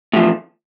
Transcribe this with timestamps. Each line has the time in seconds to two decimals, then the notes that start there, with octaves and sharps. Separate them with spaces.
0.13 A2
0.16 F3
0.19 E2